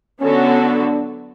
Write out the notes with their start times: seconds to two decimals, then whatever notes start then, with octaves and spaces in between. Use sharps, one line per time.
0.20 D3 F#3 B3 C#4 F#4 A4
0.63 D4